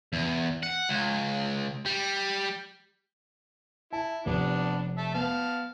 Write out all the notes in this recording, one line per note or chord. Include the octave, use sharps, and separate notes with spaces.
E2
F#5
C#2
G3
E4 A5
F1 B3 D4
E5 A5
B3 F5 A5